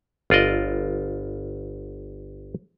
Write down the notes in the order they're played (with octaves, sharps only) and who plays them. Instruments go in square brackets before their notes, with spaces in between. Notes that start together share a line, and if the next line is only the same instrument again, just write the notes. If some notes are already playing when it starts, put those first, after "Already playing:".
[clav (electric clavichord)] G1 F4 D5 D#5